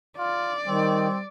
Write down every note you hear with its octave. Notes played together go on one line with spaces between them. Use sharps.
F4 D5
D#3 G3 C4